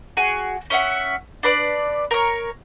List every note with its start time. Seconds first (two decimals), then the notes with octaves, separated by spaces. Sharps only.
0.17 F#4 G#4 G#5
0.70 C#4 E5 F#5
1.43 D4 B4 D5
2.11 A#4 C#5